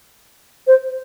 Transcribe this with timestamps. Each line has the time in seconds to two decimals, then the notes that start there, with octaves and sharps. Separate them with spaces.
0.67 C5